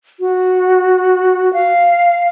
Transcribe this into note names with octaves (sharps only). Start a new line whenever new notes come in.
F#4
F5